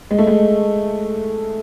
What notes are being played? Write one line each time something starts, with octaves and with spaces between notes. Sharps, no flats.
G#3
A3
G#3